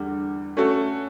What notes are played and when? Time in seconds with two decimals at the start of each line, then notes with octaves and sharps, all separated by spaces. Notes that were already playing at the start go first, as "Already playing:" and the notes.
Already playing: E2 D3 G3
0.57 A3 C#4 F#4 A4